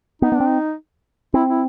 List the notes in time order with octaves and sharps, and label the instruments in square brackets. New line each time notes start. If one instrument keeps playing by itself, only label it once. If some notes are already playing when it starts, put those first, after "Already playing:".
[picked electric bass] B3 [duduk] D#4
[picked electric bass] B3
[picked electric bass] C4 [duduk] D4
[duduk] D#4
[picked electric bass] C4 [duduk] E4
[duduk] E4